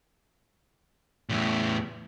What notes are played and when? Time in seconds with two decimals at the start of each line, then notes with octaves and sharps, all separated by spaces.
1.29 E2 A2